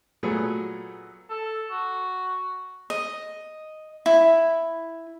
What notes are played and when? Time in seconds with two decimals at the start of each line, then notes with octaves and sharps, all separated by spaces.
0.23 A#2 F#3 A3 B3 G#4
1.30 A4
1.71 F#4
2.90 D#5
4.06 E4